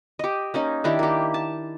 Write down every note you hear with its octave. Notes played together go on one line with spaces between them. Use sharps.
G4 D#5
A#3 C#4 D#4
D#3 D4 E4 G4
A#3 G4
A5